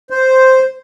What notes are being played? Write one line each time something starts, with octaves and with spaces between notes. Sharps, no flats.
C5